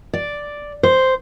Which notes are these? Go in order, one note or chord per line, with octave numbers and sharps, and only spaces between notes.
D5
C5